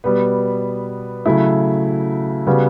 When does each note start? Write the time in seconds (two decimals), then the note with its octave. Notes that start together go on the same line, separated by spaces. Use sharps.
0.04 B2 G3 B3
1.26 C#3 F#3 A3 E4
2.47 C#3 G3 B3 F#4